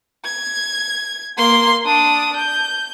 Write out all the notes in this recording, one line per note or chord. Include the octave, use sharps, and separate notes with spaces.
G#6
A#3 C6
D4 D#6
G6